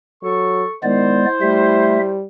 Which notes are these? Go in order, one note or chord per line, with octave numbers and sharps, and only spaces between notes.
F#3 A4 C#6
D#3 G#3 B3 E4 C5 D5
G3 A3 E5